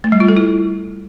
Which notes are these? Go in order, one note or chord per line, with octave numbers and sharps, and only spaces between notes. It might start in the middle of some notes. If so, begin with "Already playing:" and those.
A3
G3
F4
A4
E4